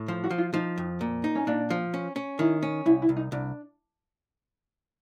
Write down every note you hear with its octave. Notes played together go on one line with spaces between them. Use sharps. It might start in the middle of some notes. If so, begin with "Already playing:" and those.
Already playing: A2
F3 C5
F#4
F3
F4
F3 D#4
F2
A#2
D#4
C#4
A#2 D4
F3
C#4
C#4
D#3 E4
C#4
C2 E4
E4
C2
D#4
C2 D4